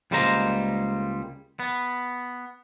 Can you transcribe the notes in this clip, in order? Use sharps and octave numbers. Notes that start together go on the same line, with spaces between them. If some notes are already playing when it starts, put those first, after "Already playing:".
C#2 G3 G#3 A#3 C5 A#5
B3